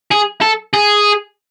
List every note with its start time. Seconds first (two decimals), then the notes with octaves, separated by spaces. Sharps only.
0.12 G#4
0.42 A4
0.74 G#4